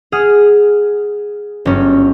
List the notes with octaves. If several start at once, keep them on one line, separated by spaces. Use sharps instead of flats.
G#4 F#5 D#6 F6
G1 F#3 C#4